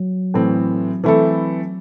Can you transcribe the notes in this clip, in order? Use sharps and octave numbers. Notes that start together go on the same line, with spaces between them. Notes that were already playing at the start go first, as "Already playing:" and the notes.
Already playing: F#3
A2 E3 A3 C4
E3 A3 C4 E4 A4